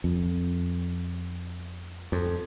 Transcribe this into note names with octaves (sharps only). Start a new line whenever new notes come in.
F2
F2